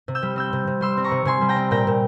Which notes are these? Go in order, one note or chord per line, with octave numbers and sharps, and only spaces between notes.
C3
E6 G6
G3
C4 E6 G6
C3
C3
G3 C6 E6
C4
A#5 C#6
C3
C3 G#5 C6
G3
G5 A#5
C4
A#2 G5 A#5
A#2